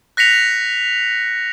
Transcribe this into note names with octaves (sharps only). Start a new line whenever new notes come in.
F#6 A#6 B6 C#7 F7